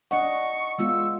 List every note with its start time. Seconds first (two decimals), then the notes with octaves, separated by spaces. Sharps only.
0.11 D4 D#5 F#5 C#6
0.79 G#3 B3 F4 E6